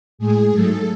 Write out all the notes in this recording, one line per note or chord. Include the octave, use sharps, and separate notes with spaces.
A2 G#3 G#4
G#2 F#3 A3 A4